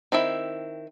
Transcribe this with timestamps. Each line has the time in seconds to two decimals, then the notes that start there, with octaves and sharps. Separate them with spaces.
0.12 D#3 C4 E4 E5